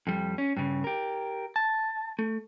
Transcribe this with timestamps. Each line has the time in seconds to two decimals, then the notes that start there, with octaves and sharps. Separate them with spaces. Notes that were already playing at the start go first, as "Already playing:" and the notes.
0.07 F2 G3
0.38 C#4
0.57 G2 C#3
0.84 G4 A#4
1.56 A5
2.19 A3